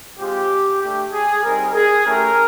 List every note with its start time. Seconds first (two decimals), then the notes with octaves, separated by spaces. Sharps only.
0.18 G#3 C4 F4 G4
0.81 A3 D4 G4
1.12 G#4
1.43 G3 C4 D#4 A#4
1.74 G#4
2.05 A3 C#4 E4 G4 A#4